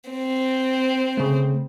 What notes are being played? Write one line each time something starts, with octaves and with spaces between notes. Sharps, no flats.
C4
C#3 A3